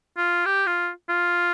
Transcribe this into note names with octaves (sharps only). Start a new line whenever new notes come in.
F4
G4
F4
F4